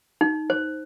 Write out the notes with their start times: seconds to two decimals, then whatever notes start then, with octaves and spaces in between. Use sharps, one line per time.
0.21 D#4
0.50 C5